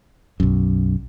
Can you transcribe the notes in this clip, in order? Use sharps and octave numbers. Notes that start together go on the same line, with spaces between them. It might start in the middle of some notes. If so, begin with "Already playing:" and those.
B1 F#2